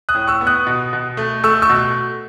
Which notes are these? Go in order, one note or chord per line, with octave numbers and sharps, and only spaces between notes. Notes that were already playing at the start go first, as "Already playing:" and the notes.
D#6 F#6
A2
C#6 E6
B3
D#6 F#6
B2
B2
A3
A3 C#6 E6
C#6 E6
B2